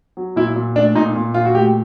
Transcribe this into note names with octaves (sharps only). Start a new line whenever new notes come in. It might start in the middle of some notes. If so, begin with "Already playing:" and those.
F#3
A#2 E4
A#2
A3 D4
A#2 D#4
A#2
A#2 F4
F#4
A3 G4